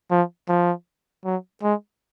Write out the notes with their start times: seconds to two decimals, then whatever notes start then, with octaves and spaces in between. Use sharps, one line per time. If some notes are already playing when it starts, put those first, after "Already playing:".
0.11 F3
0.49 F3
1.25 F#3
1.63 G#3